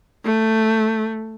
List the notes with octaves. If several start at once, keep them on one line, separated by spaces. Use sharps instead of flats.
A3